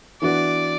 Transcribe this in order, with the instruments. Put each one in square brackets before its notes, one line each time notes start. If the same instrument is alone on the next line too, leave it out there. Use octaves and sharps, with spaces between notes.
[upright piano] E3 B3 D4 F#4 [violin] D5